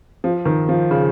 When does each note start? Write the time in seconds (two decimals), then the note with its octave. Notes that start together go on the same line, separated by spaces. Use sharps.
0.24 F3
0.45 D#3
0.69 F3
0.91 C#3